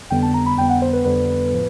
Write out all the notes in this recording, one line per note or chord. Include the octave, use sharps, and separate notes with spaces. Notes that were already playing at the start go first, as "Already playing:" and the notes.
F2 D3 G3 B3 G5
A5
A#5
B5
F2 D3 G3 B3 G5
F#5
C5
B4
F2 D3 G3 B3 B4
A2 F3